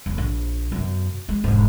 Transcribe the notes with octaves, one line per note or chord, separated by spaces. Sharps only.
D#1
A#1
F#2 B2
G#3
E1 G#2